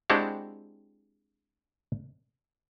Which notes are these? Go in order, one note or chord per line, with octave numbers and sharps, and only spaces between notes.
G#3 C4 D4 E4 F#4 G4